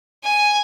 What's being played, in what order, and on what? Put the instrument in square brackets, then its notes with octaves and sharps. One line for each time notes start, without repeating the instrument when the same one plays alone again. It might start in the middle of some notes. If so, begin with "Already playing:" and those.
[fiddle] G#5